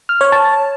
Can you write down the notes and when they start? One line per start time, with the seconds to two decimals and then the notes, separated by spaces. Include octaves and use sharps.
0.09 F6
0.21 C#5
0.32 A5